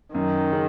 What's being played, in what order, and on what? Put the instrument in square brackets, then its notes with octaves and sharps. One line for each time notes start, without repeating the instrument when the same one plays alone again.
[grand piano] F#2 [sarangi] D#3
[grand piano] C#3